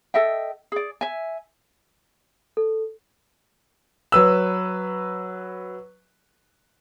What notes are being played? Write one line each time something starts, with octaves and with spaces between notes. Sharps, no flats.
A4 D#5 E5 G5
G#4 D5
E5 G#5
A4
F#3 B4 E6